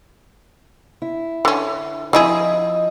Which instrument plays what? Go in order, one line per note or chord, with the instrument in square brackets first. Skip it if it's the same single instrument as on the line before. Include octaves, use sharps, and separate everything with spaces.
[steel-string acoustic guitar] E4
[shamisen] D3 C#4
[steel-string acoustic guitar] F3 D#5 [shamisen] C4 E4 G#4